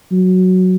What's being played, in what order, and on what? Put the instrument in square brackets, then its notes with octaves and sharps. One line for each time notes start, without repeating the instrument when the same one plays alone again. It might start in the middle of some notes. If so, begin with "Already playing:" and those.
[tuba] F#3